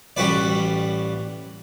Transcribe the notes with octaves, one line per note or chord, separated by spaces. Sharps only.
A1 G3 F#4 B4 D5